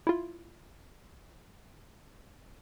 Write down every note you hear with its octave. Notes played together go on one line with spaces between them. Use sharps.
E4 F4